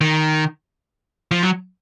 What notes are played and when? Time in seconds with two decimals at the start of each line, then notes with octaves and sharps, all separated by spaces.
0.01 D#3
1.31 F3
1.43 F#3